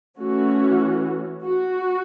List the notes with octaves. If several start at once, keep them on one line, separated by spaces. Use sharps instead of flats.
E3 A3 C#4 F#4
F#4